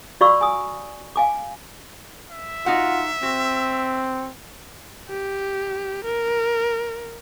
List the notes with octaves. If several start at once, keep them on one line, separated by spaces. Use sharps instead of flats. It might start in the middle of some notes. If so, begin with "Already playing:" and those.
F#4 D5 F5 B5 C#6 E6
G#5 D#6
F5 G#5 D6
E5
D#4 F4 F#4 F#5
C4 F#4
G4
A#4